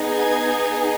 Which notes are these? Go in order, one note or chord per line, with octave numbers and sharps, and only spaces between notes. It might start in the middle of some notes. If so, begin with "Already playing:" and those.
Already playing: B3 D#4 G#4
G#6